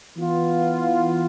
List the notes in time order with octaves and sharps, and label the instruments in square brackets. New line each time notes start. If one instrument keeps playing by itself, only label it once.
[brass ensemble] E3 B3 F4